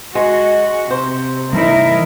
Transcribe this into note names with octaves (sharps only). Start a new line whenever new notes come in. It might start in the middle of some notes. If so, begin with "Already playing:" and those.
G#3 F#4
C3 C5
E3 G3 D#4 E4 A#4